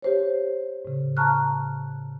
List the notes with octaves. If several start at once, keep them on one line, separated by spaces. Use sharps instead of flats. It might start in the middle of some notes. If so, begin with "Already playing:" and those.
G4 C5 C#5
A2 C#3
A5 A#5 C#6 F6 F#6